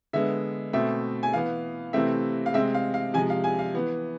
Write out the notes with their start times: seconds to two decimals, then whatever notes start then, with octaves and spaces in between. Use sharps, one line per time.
0.13 D3 G#3 B3 E5
0.73 B2 A3 C4 E5
1.23 G#5
1.33 E3 B3 F5
1.93 C3 E3 A3 C4 E5
2.46 F5
2.54 C3 G#3 C4 E5
2.74 F5
2.94 F5
3.14 C3 F3 G#3 G#5
3.30 F5
3.44 G#5
3.59 F5
3.74 E3 B3